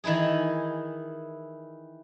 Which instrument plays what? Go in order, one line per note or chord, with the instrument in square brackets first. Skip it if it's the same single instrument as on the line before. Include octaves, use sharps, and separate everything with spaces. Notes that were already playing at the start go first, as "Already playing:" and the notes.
[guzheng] D#3 E3 D#4 E4 G#4